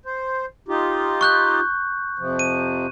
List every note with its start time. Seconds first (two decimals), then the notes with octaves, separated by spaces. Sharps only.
0.05 C5
0.68 D#4 F4 G4
1.21 C#6 F#6 G6
2.19 F2 C3 F3
2.39 D#7